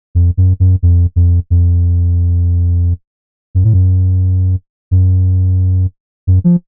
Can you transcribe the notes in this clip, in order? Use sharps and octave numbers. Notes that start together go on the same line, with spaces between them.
F2
F#2
F#2
F2
F2
F2
F#2
A2
F#2
F#2
F#2
F3